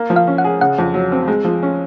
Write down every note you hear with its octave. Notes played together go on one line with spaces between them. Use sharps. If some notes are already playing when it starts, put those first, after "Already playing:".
Already playing: A#3
F3
F5
C#4
F#5
G#4
C#3 F#5
F2
F#3
C4
G#3
F3
C#4